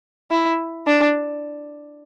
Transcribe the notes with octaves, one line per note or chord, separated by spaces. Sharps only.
E4
D4